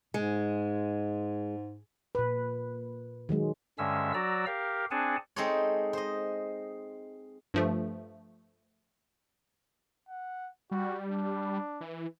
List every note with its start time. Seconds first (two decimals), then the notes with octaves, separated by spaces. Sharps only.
0.14 G#2 G#3
2.15 A#2 B4
3.29 D#3 F#3 G#3
3.78 G2 D3 G#3 C#4 E5 E6
4.14 F#3 F#4 D5 A#5 E6
4.46 G4 A#4 F5
4.91 C4 D4 G#4 F#5 G#5 A5
5.36 G#3 C4 D#4 A4 C5 C#5
5.93 C5 D#5
7.54 G2 F3 A3
10.09 F#5
10.71 G3 F#4
11.07 D4
11.81 E3